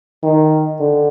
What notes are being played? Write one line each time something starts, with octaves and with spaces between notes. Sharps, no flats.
D#3
D3